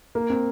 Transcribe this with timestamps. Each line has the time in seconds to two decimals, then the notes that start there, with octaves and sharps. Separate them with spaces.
0.15 A#3
0.30 C4